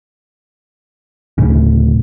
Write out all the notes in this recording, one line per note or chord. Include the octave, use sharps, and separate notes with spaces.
D2 A2 C#3